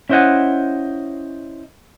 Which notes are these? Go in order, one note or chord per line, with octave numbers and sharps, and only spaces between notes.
C#4 E4 C5 D#5 F#5 G#5